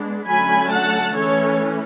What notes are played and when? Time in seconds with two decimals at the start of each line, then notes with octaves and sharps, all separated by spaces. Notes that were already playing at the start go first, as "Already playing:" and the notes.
Already playing: G#3 B3 D4
0.26 D3 F#3 A3 C#4 G#5 B5
0.71 F#5 A5
1.15 E3 A3 C#4 A4 C#5